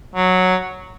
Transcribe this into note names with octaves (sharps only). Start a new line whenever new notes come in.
F#3